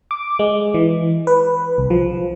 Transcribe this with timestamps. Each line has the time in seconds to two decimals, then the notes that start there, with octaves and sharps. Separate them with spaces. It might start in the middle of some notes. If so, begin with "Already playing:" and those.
0.11 D6
0.39 G#3
0.74 E3
1.27 B4
1.78 C2
1.90 F3